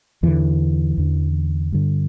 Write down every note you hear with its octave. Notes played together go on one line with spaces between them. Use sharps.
E2 D3 E3
E2 D3
G2 D3